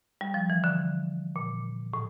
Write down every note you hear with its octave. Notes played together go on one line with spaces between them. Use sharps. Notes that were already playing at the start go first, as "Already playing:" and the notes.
G3
F3
E3
D3
A#2
A2